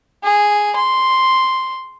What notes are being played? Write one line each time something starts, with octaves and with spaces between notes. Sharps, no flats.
G#4
C6